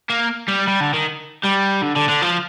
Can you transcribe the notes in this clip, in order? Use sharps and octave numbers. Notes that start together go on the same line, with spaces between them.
A#3
G3
G3
D3
D#3
G3
D3
D3
D3
F3